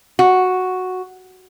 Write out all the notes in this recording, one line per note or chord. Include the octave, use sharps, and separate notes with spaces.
F#4